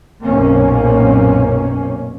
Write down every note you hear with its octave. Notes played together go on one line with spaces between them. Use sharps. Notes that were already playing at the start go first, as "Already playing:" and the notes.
B1 F#2 A#2 A#3 C4 C#4